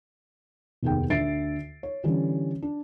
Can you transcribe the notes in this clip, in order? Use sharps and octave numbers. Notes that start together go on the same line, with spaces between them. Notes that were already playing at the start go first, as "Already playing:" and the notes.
F1 D#2 B3 G#4 G5
D2 D3 E5 A6 C7 D7
C#5
D3 E3 G3 C#4
D4